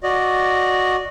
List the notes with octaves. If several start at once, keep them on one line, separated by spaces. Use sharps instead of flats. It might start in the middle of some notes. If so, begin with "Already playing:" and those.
F#4 D5 D#5